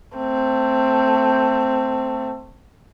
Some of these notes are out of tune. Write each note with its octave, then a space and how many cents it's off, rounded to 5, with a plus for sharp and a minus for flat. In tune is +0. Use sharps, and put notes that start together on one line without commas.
A3 +20 C4 +0